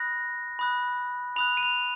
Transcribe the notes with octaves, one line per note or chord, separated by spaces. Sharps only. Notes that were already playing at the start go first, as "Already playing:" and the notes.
Already playing: B5 D#6 F#6 A#6
B5 D#6 F#6
B5 D#6 F#6 F7
D#7
F7